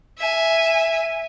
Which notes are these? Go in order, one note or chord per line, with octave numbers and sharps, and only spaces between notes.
E5 G#5